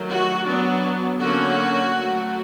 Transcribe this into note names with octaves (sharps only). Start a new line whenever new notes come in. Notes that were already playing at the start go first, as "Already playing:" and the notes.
Already playing: D#3 F#3 A3
F#4
F#3 B3 D4
D3 F#3 A#3 C#4 F#4
F#3 A3 C4